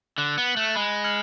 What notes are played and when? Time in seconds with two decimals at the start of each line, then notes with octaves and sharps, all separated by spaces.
0.18 D3 F#6
0.38 B3
0.46 C#7 F#7
0.57 A3
0.76 G#3 B5
1.04 F6 G#6 C#7 F#7